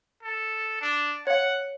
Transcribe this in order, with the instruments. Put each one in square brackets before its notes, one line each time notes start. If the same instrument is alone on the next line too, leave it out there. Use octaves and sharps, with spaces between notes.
[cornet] A4
D4
[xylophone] C#5 F5 [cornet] F#5